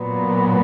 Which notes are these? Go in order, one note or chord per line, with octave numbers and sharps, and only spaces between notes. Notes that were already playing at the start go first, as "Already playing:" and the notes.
Already playing: A#2 F#3 B3